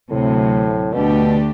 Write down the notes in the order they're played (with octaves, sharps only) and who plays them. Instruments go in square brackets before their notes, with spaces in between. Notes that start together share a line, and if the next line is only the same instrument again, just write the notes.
[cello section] D2 C3 F#3 [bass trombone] A2
[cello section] D2 D3 A3 D4 G4 [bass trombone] B2